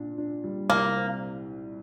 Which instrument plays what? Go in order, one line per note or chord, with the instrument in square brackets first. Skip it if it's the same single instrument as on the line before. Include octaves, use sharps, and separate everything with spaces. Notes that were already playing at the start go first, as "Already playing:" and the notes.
Already playing: [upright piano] A#2 D4
D4
G3
[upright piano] C2 [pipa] A#3
[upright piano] C4